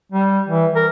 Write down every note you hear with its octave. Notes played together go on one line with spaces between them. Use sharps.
G3
E3
A#4